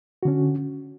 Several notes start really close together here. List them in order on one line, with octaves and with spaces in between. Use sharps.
F#4 D3 C#4